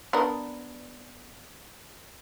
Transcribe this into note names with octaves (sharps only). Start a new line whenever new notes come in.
B3 D4 A#4